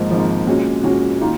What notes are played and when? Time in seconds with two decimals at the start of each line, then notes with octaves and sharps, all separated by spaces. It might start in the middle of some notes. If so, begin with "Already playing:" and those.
Already playing: G#1 G#2 F3 A#3
0.11 G#1 G#2 F3 A#3
0.47 A#2 G#3 C#4 F#4
0.84 A#2 G#3 C#4 F#4
1.21 D#3 A#3 F4